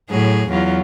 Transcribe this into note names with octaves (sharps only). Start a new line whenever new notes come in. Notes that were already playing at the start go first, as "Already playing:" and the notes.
A2 F#3 G#4
E2 F#3 F4